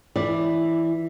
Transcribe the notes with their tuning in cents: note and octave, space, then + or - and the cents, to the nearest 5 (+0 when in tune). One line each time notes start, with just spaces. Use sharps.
E3 +0 D5 +0